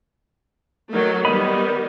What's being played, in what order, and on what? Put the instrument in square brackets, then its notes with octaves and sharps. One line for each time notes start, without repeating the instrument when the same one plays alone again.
[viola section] D#3 F#3 A3
[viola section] D#3 G3 B3 [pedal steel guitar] D#5 B5